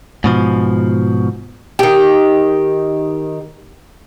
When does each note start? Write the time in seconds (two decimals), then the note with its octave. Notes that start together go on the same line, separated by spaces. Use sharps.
0.24 G#2 B2 F3
1.79 D#3 G4